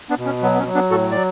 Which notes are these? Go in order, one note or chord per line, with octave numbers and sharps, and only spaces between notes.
B3 D4
B2
C#4
F#3 B3
B3
C#4
F#3
B3 D4
A2 F#4 A4
F#3 D5